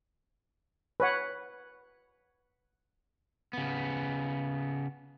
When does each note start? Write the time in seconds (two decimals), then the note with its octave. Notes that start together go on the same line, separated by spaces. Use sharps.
1.00 B4 C#5 F#5
3.53 C#3 B3